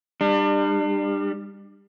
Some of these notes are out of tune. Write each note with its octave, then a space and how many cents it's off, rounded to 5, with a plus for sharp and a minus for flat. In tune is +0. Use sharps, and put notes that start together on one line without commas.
G3 +25 D4 +40